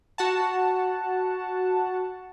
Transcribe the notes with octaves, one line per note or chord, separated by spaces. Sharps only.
F#4 F#5 A5